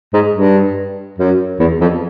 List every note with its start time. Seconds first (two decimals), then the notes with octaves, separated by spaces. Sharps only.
0.14 G#2
0.34 G2
1.18 F#2
1.60 E2
1.81 F2